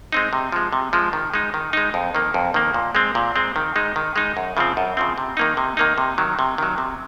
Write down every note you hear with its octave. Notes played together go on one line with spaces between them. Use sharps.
G#3 C4 D#4
C3
F3 G#3
C3
F3 G#3
D#3
G#3 D#4
D#3
G#3 D#4
F2
D#3 A#3
F2
D#3 A#3
A#2
G#3 C4
A#2
G#3 C4
D#3
G#3 D#4
D#3
G#3 D#4
F#2
C#3 F3 C4
F#2
C#3 F3 C4
C3
D#3 A#3 D#4
C3
D#3 A#3 D#4
C3
D#3 F#3
C3
D#3 F#3
C3